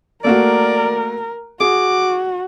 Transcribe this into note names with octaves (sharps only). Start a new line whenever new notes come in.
A3 A#3 F#4 A#4 D5
F#4 G#4 D6